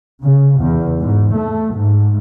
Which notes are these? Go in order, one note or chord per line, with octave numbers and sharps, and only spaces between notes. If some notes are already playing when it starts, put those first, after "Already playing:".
C#3
E2
G#2
A3
G#2